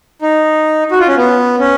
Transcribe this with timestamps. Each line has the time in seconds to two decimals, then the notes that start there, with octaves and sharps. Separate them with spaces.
0.22 D#4
0.91 F#4
0.99 F4
1.08 C#4
1.17 B3
1.60 C#4